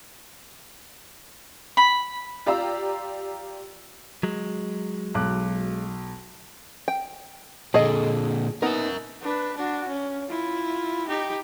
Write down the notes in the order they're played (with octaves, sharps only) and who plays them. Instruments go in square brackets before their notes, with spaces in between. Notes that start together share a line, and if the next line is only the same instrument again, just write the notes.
[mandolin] B5
[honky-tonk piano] F4 G4 D5 F5 A#5 E6
[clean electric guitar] F#3 G#3
[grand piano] B1 D6 F#6
[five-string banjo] G5
[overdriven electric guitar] A#2 D3 [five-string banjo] G#4 A4 D#5
[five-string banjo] B3 D#4 [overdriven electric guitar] A#4 E5
[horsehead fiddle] D4 B4
D4 F#4
C#4
E4 F4
D#4 G4